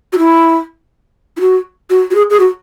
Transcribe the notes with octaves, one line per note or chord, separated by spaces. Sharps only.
F#4
E4
E4
F#4
F#4
F#4
G#4
G#4
F#4